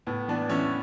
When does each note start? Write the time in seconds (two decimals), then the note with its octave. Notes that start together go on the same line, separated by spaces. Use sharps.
0.07 A2 B3
0.28 E3 B3 D4
0.49 E3 C#4 E4